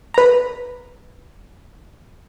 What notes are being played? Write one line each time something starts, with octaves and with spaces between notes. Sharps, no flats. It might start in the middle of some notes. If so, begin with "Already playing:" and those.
B4 A#5